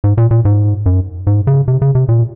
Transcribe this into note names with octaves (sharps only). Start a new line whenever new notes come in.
G#2
A#2
A#2
G#2
F#2
G#2
C#3
C3
C#3
C3
A#2